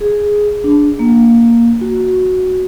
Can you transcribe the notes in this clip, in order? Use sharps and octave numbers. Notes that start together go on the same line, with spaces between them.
G#4
D4
A#3
F#4